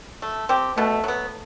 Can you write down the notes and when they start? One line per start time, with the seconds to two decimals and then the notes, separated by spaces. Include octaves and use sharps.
0.22 A3
0.49 C4 G4
0.77 B2 A3
1.04 F#3 B3